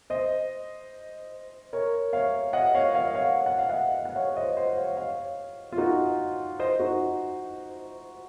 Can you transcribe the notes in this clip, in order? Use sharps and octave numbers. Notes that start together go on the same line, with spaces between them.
C5 D#5
A#4 C#5
C#5 F5
D#5 F#5
C#5 F5
C#5 F5
C#5 F5
F#5
F5
D#5 F#5
F#5
C#5 F5
C5 D#5
C5 D#5
C#5 F5
C#5 F5
F4
D#4 F#4
C5 D#5
D#4 F#4